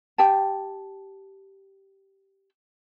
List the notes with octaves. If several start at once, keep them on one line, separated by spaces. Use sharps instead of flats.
G4 G5 A5